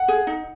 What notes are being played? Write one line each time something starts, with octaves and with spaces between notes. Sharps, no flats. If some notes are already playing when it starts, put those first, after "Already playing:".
Already playing: F#5
G#4
D#4